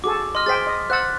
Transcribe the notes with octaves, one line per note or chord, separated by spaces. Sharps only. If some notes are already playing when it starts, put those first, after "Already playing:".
F#4 G#4 A4 D6
D#5 C6 F6
G#4 C5 G5 A6 B6
D#5
C5 F#5 E6 F#6 A6